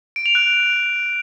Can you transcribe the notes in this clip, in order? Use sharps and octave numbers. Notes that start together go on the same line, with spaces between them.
D7
F7
F#6